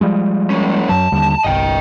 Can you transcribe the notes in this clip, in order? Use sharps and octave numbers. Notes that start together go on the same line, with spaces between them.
F3 G3 G#3
A#3 C#4
F#2 F#3 A5
D#2 D3 G3
G1 C2 D#5 G5